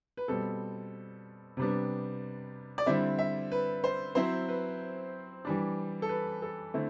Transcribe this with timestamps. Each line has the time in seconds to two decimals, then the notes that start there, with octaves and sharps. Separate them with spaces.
0.17 B4
0.28 B2 G3 C4 A4
1.57 C3 G3 B3 D4
2.78 D5
2.86 D3 G3 C4 E4 E5
3.19 E5
3.52 B4
3.84 C5
4.15 F#3 C4 E4 C5
4.49 B4
5.45 E3 G3 D4
6.02 A4
6.09 B4
6.42 A4
6.74 D3 A3 C4 E4